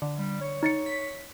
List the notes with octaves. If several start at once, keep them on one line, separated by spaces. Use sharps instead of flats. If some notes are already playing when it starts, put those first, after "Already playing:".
D3
G3
C#5
D#4 A6 C#7
B6